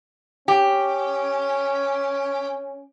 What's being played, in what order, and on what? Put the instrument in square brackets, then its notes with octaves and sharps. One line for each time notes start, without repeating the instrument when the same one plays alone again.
[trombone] C#4 [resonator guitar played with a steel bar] G4